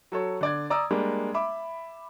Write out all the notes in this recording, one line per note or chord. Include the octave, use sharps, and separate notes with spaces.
F#3 A4 C#5
D3 D5 G#6
D5 A#5 D#6 E6
G3 G#3 A#3 D4
E5 B5 D6